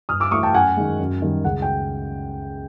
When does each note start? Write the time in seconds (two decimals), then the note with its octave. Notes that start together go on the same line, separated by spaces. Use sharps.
0.09 G2 D#6 F6
0.20 D6 E6
0.31 E3 A3 C#6 D#6
0.43 G5 A5
0.54 F#2 F#5 G#5
0.77 D#3 G#3
1.00 F#2
1.22 D#3 G3
1.44 C#2 F#5
1.62 G5